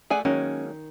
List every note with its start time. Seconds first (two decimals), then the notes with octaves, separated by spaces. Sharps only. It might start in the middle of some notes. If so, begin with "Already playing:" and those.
0.10 A3 G#4 D5 F#5 G#5
0.25 D#3 F#3 G#3 A#3 C#4